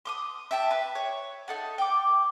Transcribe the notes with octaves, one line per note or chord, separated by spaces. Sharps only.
C6 D6 D#6
E5 G5 A5
B4
C#5
D#4 A4 F#5
G5 D6